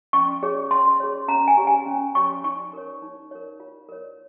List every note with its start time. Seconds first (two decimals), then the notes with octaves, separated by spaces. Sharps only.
0.13 C#4 C#6
0.43 G#4 C#5
0.71 C#4 C6
1.00 G#4 C#5
1.28 C#4 A#5
1.48 G#5
1.57 G4 C#5
1.67 G#5
1.86 C#4
2.15 G4 C#5 C#6
2.44 D#4 C#6
2.73 A#4 C#5
3.02 D#4
3.31 A#4 C#5
3.60 F4
3.89 A#4 C#5